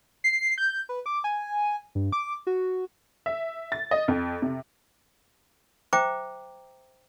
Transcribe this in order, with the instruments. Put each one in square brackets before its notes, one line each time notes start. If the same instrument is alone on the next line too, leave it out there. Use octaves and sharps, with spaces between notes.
[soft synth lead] C7
G6
B4
D6
G#5
G2
D6
F#4
[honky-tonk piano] E5
A6
D#5
F2
C3
[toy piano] C5 E5 G5 A#5 D6